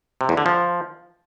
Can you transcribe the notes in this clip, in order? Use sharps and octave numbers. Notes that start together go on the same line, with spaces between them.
C3
E2
D3
F3